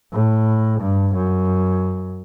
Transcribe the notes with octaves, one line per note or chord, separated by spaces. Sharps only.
A2
G2
F#2